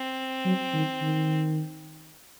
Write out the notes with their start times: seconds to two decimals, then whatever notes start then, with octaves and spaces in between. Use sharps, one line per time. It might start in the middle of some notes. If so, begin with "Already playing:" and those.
Already playing: C4
0.45 F#3
0.73 D#3
1.02 D#3